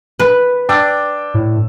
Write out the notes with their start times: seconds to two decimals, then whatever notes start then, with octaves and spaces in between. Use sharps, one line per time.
0.20 B4
0.69 D4 G5 D6 E6
1.34 A2